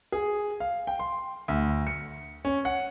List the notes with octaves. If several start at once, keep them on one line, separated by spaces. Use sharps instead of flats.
G#4
F5
G5
C6
D2
C#7
C#4
F#5